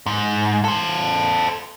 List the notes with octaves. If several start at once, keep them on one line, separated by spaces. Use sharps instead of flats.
G#2
A4 C5